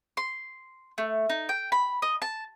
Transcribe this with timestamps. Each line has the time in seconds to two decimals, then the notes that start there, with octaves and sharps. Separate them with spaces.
0.17 C6
0.98 A3
1.29 D#4
1.49 G5
1.72 B5
2.02 D#5
2.22 A5